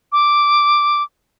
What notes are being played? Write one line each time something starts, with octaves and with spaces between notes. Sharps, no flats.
D6